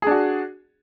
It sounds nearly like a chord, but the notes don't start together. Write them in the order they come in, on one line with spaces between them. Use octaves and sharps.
G#4 D4 F#4